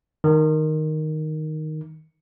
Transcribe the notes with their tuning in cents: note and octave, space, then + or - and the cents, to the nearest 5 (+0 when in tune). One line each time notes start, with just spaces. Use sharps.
D#3 -5